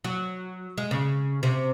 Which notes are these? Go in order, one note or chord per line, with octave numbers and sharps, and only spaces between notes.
F#3
G#3
C#3
C3